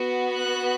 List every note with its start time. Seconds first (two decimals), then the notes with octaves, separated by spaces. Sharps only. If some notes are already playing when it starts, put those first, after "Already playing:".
Already playing: B3 F#4
0.36 F#6